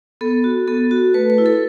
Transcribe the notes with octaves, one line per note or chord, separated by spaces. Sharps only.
B3 A4
F#4
B3 A4
F#4
A3 B4
B4
E4
A4